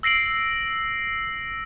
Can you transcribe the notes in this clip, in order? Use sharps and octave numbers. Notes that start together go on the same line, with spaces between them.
E6 A#6 C7 D7 F#7